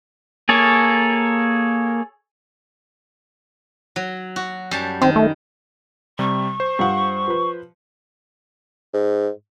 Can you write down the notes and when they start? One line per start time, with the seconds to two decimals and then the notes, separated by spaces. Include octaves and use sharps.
0.49 A#3 G#4 A4 C#5
3.96 F#3
4.36 F#4
4.71 F#2 G3 A5
5.02 D#3 C4
5.16 A3
6.19 C3 G3 C#6
6.60 C5
6.79 G2 F4 F#5
7.28 F3 B4
8.93 G#2